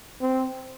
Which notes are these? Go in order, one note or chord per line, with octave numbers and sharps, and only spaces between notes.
C4